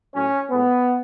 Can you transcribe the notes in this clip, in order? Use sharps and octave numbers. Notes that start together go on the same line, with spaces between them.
A2 F#3 C#4
A2 G#3 B3